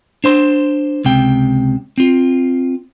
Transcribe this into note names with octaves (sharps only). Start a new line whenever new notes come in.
D4 C5 C6
C#2 C3 G5
C4 F4